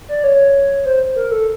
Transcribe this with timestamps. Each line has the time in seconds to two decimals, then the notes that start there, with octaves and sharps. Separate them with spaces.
0.09 D5
0.24 C#5
0.85 C5
1.16 A#4
1.31 A4